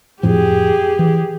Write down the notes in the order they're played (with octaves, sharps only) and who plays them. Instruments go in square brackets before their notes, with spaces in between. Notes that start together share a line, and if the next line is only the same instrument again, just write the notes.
[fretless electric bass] F2 A2 F3 [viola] G4 G#4
[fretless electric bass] E3